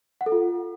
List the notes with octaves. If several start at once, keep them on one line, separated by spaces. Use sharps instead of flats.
F#5
A4
F4